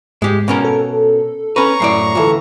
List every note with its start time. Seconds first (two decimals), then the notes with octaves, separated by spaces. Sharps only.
0.22 G#2 G#3 G4
0.48 B2 C#4 A#4
0.65 A4
1.56 C#4 B4 A#5 C#6
1.80 F#2 A2 D5 C7
2.15 D2 E3 F4 A4